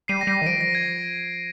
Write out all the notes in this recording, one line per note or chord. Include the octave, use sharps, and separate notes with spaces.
G3 C7 D#7
A#6
G3 C7
D#3
F3 A#6 D7
A#6
G#6